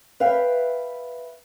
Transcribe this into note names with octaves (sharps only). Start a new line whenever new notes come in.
B4 E5 F5 G5